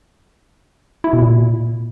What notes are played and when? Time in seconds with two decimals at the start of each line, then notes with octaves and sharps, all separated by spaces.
1.04 E4
1.13 B2
1.22 A#2